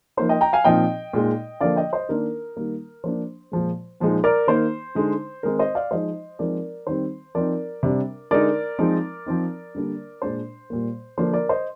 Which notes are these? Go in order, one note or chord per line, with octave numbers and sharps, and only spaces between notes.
F3 A#3 D#4 C5
D#5 G5
G5 A#5
F5 G#5
A#2 F3 C4 D#4 D#5 G5
A#2 G#3 D#4
D3 F3 A#3 D5 F5
D#5 G5
C5 D#5
D#3 A#3 D4 A#4
D#3 G3 A#3
F3 A#3 D4 C5
A#2 F3 G#3
A#2 F3 G#3 D#4
A#4 D5
D#3 A#3 D#4 C5
D3 G#3 D#4
D#3 G#3 C4 D#4 A#4
C5 D#5
D5 F5
F3 G#3 D#4 C5 D#5
F3 G#3 C4 D#4 A#4 D5
D#3 G3 C4 C5
F3 C4 D#4 A#4 D5
C3 G3 D4
D3 G#3 D#4 A#4 D5
F3 G#3 C4 D#4
F3 C4 D#4
D3 G3 A#3 D4
A#2 G#3 D4 C5
A#2 G3 A#3
D3 F3 A#3 D4 C5
A#4 D5
C5 D#5